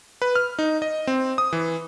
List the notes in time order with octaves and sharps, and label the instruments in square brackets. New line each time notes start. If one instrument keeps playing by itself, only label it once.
[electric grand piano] B4
F6
D#4
D#5
C4
D#6
E3